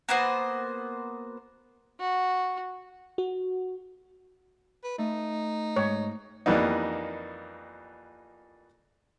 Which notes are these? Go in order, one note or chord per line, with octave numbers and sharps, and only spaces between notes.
A#3 B3 F#4 C5
F#4
F#4
B4
A3 D#4
G#2 C#5
F2 E3 G3 A#3 B3 D#4